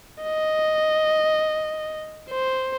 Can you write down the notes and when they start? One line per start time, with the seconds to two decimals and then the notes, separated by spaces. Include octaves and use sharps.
0.23 D#5
2.30 C5